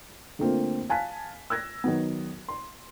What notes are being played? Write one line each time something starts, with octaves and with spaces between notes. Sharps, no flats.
D3 A3 A#3 C4 F4
F5 G#5 A5 F#6 B6
E6 F#6 G#6 A#6
D#3 F#3 B3
C6